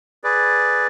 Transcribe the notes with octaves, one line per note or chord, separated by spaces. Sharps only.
G#4 B4 D5